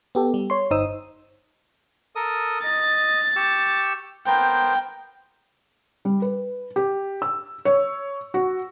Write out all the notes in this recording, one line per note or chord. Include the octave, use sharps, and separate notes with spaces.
B3 G4 A4
G3
C#5 C6
G1 D#4 C5 D#6 E6
A4 A#4 D#6
D#5 A6
G4 C#6 E6
B3 A#4 C5 G5
G3
B4
G4
E6
C#5
F#4